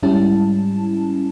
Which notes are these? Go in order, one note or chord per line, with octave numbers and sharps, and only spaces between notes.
G#2 G3 C#4 E4 A5